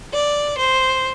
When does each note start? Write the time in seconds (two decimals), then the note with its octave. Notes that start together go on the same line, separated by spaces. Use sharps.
0.13 D5
0.58 C5